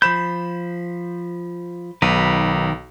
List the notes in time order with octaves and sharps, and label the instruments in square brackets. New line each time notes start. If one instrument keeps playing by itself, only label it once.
[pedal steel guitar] F3 C5 G6 [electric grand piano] B5 E7
[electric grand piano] B1 [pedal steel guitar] D#3 A#4 B4